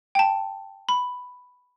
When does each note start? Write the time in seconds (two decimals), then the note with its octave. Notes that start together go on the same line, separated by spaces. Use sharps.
0.15 G5 A5
0.89 B5